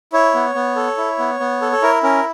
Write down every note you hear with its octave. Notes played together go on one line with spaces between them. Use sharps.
E4 C#5
B3
B3
A4
E4
B3
B3
A4
A4
E4 A#4
C#4 A#4